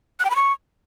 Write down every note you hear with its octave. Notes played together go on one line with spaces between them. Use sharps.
F#6
G5
B5
C#6